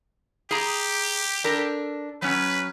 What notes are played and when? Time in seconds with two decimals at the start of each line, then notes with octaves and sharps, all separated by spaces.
0.51 G4 G#4 A#5
1.44 D4 A4 A#4
2.22 F#3 C#4 B4